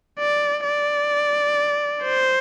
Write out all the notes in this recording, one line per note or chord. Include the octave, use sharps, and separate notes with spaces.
D5
D5
C5